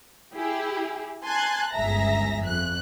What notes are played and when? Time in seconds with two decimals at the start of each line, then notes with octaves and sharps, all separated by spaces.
0.34 E4 G4 G#4
1.24 G#5 A5 C6 F#6 G#6
1.73 G1 C#2 G#4 E5 A#5 A#6
2.43 F2 F#6